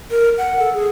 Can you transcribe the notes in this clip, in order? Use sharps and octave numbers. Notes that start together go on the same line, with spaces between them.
A#4
F#5
A4
G#4